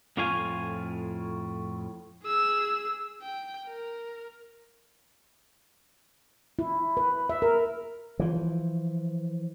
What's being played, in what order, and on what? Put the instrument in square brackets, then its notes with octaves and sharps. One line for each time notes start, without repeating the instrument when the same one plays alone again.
[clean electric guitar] F2 A2 F4 C#5 F5 G#5
[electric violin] G#4 E6
G5
A#4
[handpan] E4
B4
E5
A#4
[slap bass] E3 F3